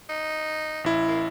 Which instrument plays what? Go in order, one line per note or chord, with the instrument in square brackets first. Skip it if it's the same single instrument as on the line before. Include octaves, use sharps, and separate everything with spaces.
[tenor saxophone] D#4
[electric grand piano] A1 E4
[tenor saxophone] A#3